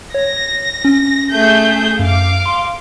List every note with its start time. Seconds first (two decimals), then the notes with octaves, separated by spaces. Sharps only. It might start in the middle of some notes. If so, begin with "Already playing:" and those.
0.14 C#5 A#6
0.85 C#4
1.32 A3 G#4 G6
1.99 F#2 F5 D6
2.46 C6